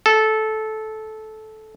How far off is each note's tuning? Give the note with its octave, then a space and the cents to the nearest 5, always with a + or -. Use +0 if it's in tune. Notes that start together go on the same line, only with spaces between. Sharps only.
A4 -15